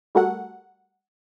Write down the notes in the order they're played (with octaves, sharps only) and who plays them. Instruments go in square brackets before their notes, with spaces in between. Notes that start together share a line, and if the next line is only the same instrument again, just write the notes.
[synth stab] G3 A3 F#4 A4 A#4 F#5